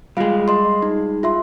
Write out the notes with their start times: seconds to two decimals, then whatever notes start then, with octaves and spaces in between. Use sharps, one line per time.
0.17 G3 G#3 F4 F5
0.48 D#5 C6
0.82 D#4
1.23 F4 E5 C6